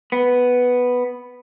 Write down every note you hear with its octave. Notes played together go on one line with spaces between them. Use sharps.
B3